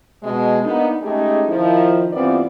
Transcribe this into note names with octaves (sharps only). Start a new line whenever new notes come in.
B2 G#3
A#3 B3 D4 D#4
G#3 A3 C#4 D#4 G4 G#4
D#3 F3 E4
G2 E3 B3 C4 F4 D5